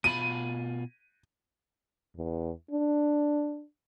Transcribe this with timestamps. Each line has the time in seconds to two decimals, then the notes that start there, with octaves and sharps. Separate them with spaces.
0.04 B2 F4 B5 D#7
2.17 E2
2.71 D4